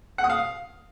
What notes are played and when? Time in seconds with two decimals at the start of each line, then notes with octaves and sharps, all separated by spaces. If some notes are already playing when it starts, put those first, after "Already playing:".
0.18 F#5
0.24 D#6
0.30 F5